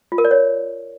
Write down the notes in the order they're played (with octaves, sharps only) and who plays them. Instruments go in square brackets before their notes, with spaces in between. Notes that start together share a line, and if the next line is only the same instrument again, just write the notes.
[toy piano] F4
A#4
D5
C#5